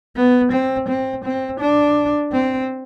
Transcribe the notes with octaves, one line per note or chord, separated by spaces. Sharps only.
B3
C4
C4
C4
D4
C4